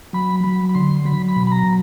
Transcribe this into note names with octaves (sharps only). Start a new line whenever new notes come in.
F#3 B5
F#3 B5
B5
D3 C6
F#3 B5
B5
B2
B5
A#5